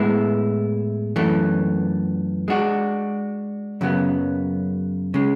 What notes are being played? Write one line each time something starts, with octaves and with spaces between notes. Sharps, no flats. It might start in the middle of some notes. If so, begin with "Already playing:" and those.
Already playing: A2 G#3 B3 E4
F#2 E3 A3
G#3 D4 F#4
F#2 C#3 F#3 B3
C#3 G#3